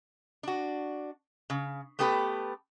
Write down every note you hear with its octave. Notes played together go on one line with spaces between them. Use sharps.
D4 F#4
C#3
A3 B3 G4 A4 B4